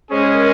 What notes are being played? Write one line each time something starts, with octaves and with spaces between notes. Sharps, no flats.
G#3 C#4 G#4 C5
A#4